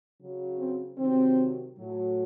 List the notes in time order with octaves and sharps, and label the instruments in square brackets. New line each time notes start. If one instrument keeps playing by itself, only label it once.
[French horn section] C#3 F#3
C4
C3 D#3 F#3 C4
A2 F#3